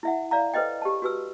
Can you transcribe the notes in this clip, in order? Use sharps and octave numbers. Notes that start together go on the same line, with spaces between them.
E4 E5 F#5
D5 F5 A#5
A4 B4 C5 D#5 G5
G4 A5
F#4 B4 E6